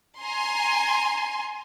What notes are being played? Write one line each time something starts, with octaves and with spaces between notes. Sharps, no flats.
G#5 A#5 C6